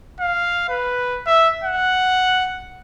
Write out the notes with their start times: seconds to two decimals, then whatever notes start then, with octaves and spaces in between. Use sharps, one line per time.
0.20 F5
0.69 B4
1.26 E5
1.64 F#5